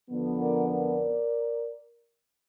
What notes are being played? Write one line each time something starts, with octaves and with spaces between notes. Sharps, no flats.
F2 D3 F3 B3
A#4 D5
A#4 D5